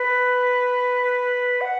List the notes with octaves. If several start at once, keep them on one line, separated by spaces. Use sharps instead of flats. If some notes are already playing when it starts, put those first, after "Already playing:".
Already playing: B4
F#5